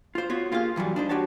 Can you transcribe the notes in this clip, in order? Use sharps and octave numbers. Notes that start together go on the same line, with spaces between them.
F4 C5
B3 F4 F#4 C#5
A#3 F4 G4 G#4 F5
G2 E3 F#3 G3
D4 D#4 C5
D4 F#4 G4 C#5 A5